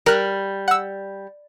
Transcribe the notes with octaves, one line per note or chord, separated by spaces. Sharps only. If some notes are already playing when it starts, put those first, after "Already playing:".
G3 A#4 F#6
F#5 E6